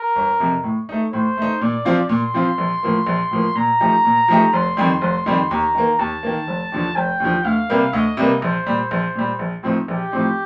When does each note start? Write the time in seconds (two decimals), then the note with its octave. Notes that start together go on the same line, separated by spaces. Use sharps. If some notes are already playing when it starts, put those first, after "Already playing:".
Already playing: A#4
0.16 G1
0.40 F2 C3
0.63 A2
0.89 A3 D#4
1.13 A2 C5
1.37 A3 D#4
1.61 A#2 D5
1.85 F3 C4 F4
2.09 A#2 C6
2.34 F3 C4 F4
2.58 A#1
2.83 A2 F3 A#3
3.07 A#1
3.31 A2 F3 A#3
3.56 A#2 A#5
3.81 F3 A3 D#4 G4
4.05 A#2
4.28 F3 A3 D#4 G4
4.53 F1 C6
4.77 F2 D#3 G3
5.01 F1
5.26 F2 D#3 G3
5.50 D#2 A#5
5.75 D#3 A#3
5.99 D#2 A5
6.23 D#3 A#3
6.47 F1
6.72 D#2 D3 F3
6.96 F1 G5
7.20 D#2 D3 F3
7.45 D2 F5
7.70 C3 G3 A#3
7.93 D2 D#5
8.17 C3 G3 A#3
8.42 A#1 C5
8.66 A#2 G3
8.91 A#1
9.15 A#2 G3
9.39 A#1
9.63 A2 F3 C4 D#4
9.88 A#1 G4
10.12 A2 F3 C4 D#4